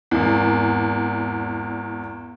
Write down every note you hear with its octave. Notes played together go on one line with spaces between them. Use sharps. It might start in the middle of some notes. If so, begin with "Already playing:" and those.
G#1 E2